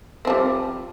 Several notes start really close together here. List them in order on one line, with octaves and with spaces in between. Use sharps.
C4 F3 G3